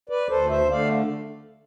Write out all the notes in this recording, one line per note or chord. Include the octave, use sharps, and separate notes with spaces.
B4 D5
D2 A4 C5
C5 E5
D3 A3 D5 F5